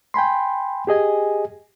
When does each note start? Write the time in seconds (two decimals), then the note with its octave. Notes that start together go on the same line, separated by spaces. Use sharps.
0.14 G5 G#5 B5 C6
0.87 G4 G#4 D#5 G#5